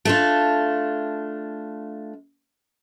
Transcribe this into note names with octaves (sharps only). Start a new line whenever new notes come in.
A3 D4 F4